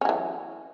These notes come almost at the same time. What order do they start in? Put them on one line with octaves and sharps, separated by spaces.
C#4 F#3 E3